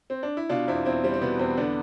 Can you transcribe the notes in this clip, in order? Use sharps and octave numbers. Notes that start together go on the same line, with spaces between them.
C4
D4
E4
B2 D4 F4
E2 C4 E4
E2 C4 E4
G3 C4
C4
B2 B3
E2 C4
D3 B3 D4